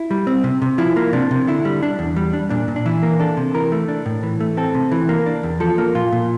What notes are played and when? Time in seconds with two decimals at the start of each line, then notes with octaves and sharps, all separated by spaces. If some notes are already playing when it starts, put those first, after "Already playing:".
Already playing: E4
0.11 G3
0.27 C4
0.44 C3
0.62 C3
0.78 F3 E4
0.96 A#3
1.13 C3 D4
1.31 C3
1.47 D3 E4
1.65 G3
1.83 D4
1.99 E2
2.16 G3
2.33 D4
2.50 A#2 D4
2.68 A#2
2.76 D4
2.86 E3 E4
3.03 A#3
3.20 D4 A4
3.37 C3
3.54 E3 A#4
3.72 A3
3.88 D4
4.06 A2
4.23 E3
4.40 A3
4.57 C4 A4
4.75 C3
4.92 E3
5.09 A#3
5.26 D4
5.43 E2
5.60 F3 A4
5.78 A#3
5.95 A#2 F4
6.12 A#2